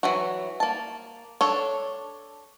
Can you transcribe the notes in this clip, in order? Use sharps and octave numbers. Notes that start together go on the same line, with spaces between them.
E3 F#3 F#4
A#3 A5
D4 A4 C#5